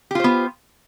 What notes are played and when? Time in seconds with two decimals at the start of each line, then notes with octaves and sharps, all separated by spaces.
0.11 G4
0.15 F4
0.20 C5
0.24 B3